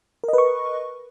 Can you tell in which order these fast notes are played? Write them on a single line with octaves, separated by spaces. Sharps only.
A#4 D#5 B4 C#6